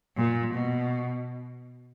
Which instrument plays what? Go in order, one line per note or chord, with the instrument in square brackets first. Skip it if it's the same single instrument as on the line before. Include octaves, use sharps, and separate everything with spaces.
[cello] A#2
B2